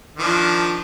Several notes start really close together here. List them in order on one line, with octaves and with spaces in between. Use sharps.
D#3 F3 D4